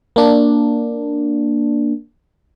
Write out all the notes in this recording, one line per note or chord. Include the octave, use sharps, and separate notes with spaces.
A#3 D4